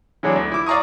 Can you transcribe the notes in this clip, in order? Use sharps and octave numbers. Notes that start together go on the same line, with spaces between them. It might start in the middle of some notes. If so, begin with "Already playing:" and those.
E3 F#3 G#3 D4
D2
E4 D6
D5 F5 A#5 C#6 D#6